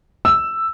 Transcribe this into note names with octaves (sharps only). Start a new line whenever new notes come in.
E6